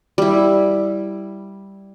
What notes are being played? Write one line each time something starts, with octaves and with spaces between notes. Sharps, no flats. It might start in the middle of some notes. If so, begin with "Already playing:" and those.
G3 E4